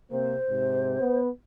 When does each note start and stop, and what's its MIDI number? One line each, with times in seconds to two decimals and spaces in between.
0.11 0.37 48
0.11 0.37 58
0.11 0.37 60
0.11 1.19 72
0.49 0.98 44
0.49 0.98 48
1.00 1.28 59